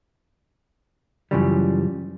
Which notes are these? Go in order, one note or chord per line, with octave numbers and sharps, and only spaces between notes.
F#2 A2 C#3 E3 F3 G3